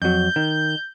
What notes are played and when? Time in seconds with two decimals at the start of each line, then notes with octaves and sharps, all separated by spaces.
0.02 F2 F#3 G6
0.36 D#3